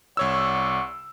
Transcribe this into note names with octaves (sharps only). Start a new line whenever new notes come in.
C2 C#5 D5 F#5 C#6 E6